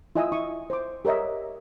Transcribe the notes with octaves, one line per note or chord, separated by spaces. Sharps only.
E4 F4 D#5 G#5 D#6 E6
E4 C#6 D#6
C5 D6
G4 A#4 C#5 D#5 E5